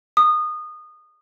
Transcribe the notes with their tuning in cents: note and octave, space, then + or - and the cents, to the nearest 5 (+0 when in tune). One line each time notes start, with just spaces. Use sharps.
D#6 -25